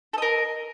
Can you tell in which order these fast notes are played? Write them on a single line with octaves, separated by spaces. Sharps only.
A4 D#5 A#4